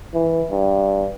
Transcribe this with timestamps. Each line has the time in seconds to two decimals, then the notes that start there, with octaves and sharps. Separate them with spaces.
0.14 E3
0.50 G2